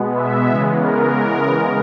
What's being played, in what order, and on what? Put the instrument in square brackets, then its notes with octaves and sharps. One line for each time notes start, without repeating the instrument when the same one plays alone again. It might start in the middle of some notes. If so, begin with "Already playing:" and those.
Already playing: [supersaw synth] B2 G#3 B3
E5
C#3 E3 G#3 B3 E5
A#4